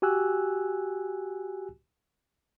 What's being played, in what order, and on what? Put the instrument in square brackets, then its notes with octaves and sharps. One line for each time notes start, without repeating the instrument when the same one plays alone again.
[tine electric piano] F#4 G4 G#5 E6 F#6